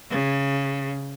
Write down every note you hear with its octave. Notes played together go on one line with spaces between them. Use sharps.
C#3